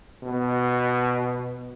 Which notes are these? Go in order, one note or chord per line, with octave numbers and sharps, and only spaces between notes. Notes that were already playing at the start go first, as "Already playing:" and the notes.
B2